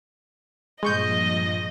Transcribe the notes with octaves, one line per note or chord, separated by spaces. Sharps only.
G2 A#2 F3 G#3 D#5 C#6 G6